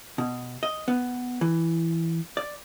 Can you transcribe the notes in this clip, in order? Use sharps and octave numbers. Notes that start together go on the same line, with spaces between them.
B2
D#5
B3
E3
D5